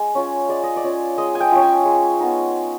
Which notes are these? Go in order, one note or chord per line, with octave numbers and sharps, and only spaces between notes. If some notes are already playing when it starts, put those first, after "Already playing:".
Already playing: G#3
C#4 F4
G#3 D5
D#5
D5
C#4 F4
G#3 D#5
G#5
G5
C#4 F4
G#5
G#3
B3 D#4